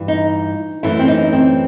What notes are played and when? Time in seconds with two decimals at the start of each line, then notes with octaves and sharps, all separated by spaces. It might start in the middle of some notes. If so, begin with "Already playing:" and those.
Already playing: G2 E3 G3
0.08 D#4
0.83 F#2 E3 A3 E4
0.99 C4
1.08 D#4
1.33 C4